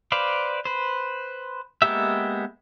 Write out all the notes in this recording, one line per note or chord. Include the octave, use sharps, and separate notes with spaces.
B4 C5 D5 F5
B4 C5
G#3 A#3 B3 G4 E5